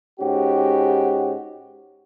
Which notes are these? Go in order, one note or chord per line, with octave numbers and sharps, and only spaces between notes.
G#2 C#4 F#4 G4